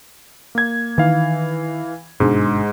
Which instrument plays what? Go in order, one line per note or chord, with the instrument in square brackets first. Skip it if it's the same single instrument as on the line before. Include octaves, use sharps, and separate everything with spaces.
[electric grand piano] A#3 G#6
[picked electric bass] D#3 [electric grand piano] E3 F5
[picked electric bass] G1 B2 D4 [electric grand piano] G#2 G#3